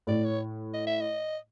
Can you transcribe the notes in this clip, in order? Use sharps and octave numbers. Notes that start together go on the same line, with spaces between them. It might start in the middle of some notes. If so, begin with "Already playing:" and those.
A2 D5
C#5
D#5
E5
D#5